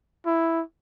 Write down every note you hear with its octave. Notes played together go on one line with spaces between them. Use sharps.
E4